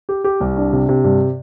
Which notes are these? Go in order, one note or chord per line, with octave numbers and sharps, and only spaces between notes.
G4
G4
C2
D4
C3
C3
G2